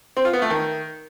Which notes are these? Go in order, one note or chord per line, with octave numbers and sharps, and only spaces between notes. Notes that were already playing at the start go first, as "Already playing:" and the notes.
C4
F4
B3
A3
D#3